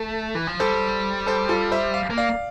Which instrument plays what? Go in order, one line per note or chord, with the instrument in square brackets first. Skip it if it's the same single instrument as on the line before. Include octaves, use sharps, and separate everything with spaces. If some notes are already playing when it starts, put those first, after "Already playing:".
Already playing: [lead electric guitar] A3
E3
F3
[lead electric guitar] G3 [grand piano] A4 C5
[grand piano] A4 C5
F4 A4
C5 E5
F5
[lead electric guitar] A#3
[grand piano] D5 F5